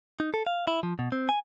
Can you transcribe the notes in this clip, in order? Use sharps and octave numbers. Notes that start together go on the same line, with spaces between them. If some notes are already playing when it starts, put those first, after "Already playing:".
D#4
A4
F5
E4
F3
B2
C4
G#5